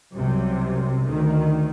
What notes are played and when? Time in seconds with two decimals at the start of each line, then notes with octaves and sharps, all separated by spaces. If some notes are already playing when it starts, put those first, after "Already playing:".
0.12 C2 F#2 C3
1.02 D2 D#3